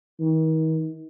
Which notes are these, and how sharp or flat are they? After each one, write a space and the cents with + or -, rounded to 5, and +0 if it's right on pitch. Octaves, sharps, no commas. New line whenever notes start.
D#3 +40